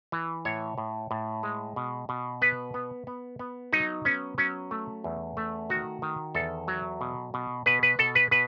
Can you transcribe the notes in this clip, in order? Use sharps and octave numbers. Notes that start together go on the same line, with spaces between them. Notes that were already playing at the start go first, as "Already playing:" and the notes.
E3
A2 C#5
A2
A2
G#3
B2
B2
B3 B4
B3
B3
B3
F#3 D#4
B3 C#4
F#3 C#4
A3
E2
A3
D#3 F#4
D#3
E2 A4
F#3
B2
B2
B2 B4
B4
B2 A4
B4
B2 B4